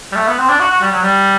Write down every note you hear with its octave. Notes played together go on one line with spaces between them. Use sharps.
G3
A3
B3
C4
D4
F#4
F#4
G3
F#3
G3